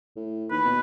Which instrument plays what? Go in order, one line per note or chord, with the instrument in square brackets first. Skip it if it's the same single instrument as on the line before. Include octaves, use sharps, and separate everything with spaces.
[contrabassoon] A2
[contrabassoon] D#2 [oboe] B4
[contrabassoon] B2